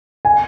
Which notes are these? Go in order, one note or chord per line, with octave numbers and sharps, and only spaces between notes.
G#5